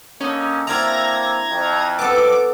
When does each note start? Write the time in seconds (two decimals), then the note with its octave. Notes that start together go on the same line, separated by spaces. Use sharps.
0.21 D3 A#3 C#4 D#4
0.67 D3 A#3 C4 E4 D5 F5 A#5 G#6
1.50 F2
1.99 B3 A4 D6